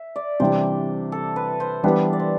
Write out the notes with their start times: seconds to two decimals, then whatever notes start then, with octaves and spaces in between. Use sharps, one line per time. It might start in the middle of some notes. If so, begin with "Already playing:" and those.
Already playing: E5
0.16 D5
0.40 C3 E3 G3 D4 G4 C5
1.12 A4
1.36 B4
1.60 C5
1.83 E3 G3 B3 D4 B4
2.13 D5
2.20 C5